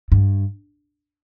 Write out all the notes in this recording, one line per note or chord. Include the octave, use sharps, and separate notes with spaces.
G2